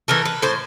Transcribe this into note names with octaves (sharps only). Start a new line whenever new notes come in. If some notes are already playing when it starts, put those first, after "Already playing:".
E3 A3 A#4
B4
A2 C5